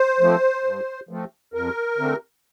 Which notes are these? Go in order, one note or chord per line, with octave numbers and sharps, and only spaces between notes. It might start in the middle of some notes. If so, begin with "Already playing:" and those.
Already playing: C5
F3 A3 C4
G2
F3 A3 C4
F2 A#4
D3 A3 C4